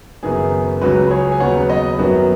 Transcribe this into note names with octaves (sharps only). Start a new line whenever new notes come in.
F#1 F#2 D#3 B3 G#4
C#2 C#3 F#3 F#4 B4
G#4 C#5
G#5
D#2 C#3 F#3 B3 C#5 F#5
B4 D#5
G#1 F#2 D#3 F#3 B3 F#4